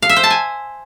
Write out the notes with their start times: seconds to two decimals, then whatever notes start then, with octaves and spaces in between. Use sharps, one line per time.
0.02 F5
0.09 E5
0.16 C5
0.23 A5
0.30 G#5